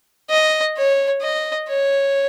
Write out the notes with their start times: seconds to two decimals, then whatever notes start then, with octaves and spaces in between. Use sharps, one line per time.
0.30 D#5
0.77 C#5
1.22 D#5
1.68 C#5